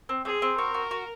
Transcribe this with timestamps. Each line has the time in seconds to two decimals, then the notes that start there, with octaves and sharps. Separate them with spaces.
0.09 C4
0.25 C4 G#4
0.42 C4
0.58 F#4 A#4
0.74 F#4
0.91 F#4